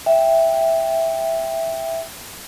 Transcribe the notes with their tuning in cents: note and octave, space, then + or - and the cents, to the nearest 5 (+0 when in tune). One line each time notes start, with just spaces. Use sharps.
E5 +0 G5 +5